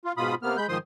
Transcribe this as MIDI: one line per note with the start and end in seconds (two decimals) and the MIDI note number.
0.05 0.12 65
0.17 0.35 44
0.17 0.35 47
0.17 0.35 65
0.17 0.35 83
0.17 0.35 87
0.42 0.57 48
0.42 0.57 58
0.42 0.57 59
0.42 0.57 89
0.57 0.67 56
0.57 0.67 83
0.57 0.67 91
0.69 0.78 44
0.69 0.78 51
0.69 0.78 53
0.69 0.78 72
0.69 0.78 84
0.69 0.78 87